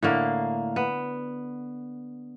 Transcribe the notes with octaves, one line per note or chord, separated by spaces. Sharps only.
A2 D3 A#3
B3